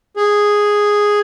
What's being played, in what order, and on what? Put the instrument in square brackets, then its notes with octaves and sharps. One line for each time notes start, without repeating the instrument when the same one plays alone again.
[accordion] G#4